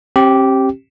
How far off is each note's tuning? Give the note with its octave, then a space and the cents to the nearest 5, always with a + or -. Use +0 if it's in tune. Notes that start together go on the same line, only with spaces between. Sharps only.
C4 +40 G4 -10